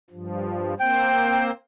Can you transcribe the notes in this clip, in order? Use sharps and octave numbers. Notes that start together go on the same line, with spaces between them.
G2 F3
A#3 C4 C5 G5